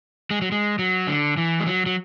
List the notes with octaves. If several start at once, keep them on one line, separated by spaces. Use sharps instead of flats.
G#3
F#3
G#3
F#3
D3
E3
G#3
F#3
F#3